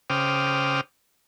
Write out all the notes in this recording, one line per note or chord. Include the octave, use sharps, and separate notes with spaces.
C#3 C5 G5 D6 D#6 F6